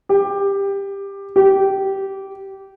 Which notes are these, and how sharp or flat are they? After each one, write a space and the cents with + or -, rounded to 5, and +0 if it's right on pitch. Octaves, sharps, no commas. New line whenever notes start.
G4 +15
G4 -15